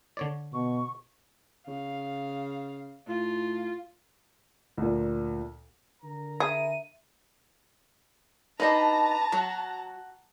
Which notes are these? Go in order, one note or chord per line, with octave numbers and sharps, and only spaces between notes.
D3 C#5 D5
B2 C#6
C#3 F5
A2 F4
D2 A#2
D3 A#4 A#5
E4 G#4 D#7
D4 D#4 F#4 B4 D#5 A5 A#5
F#3 F#4